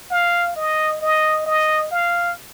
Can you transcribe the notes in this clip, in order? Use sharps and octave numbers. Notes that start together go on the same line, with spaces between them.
F5
D#5
D#5
D#5
F5